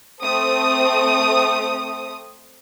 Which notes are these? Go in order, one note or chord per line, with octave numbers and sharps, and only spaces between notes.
A3 C4 D#6